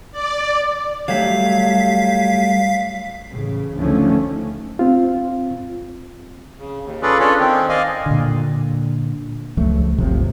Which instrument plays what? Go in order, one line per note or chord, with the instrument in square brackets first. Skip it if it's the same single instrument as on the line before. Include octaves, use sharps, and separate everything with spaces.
[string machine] D5
[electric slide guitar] F#3 G3 A3 [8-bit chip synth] F5 B6
[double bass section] A1 C#3
D2 D3 D#3 F3 A3 C#4
[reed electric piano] C4 F4
[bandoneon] C#3
D#2
C#4 F4 G#4 A4 B4 D5
C#4 D4 F4 A4 C#5 D5
D#3 C4
D5 D#5 F5 G#5
[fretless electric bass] A#2 D3
C#2 F3 F#3 A3
G1 C#2 C3 F3